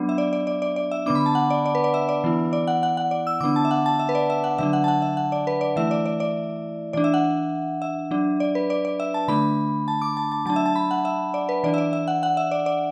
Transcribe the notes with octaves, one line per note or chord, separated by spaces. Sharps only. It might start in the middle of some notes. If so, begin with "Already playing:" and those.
Already playing: F#3 B3 D4
E5
D5
D5
D5
D5
D5
E5
D3 B3 D4 D6
B5
A5
F#5
D5
D5
B4
D5
E5
D5
E3 B3 E4
D5
F#5
F#5
F#5
D5
E6
D3 B3 D4 D6
A5
E5
F#5
A5
E5
B4
D5
E5
F#5
D3 F#3 D4 E5
F#5
A5
F#5
E5
F#5
D5
B4
D5
E3 A3 E4 E5
D5
D5
D5
E3 D4 D5
E5
F#5
E5
F#3 D4
D5
B4
D5
D5
E5
A5
D3 A3 D4 B5
A5
D6
A5
A5
F#3 D4 A5
E5
A5
B5
F#5
E5
D5
B4
E3 D4 D5
E5
D5
E5
F#5
F#5
E5
D5
D5